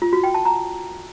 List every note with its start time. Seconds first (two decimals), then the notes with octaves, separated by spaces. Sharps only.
0.02 F4
0.13 F#4
0.24 G5
0.34 A5
0.45 A#5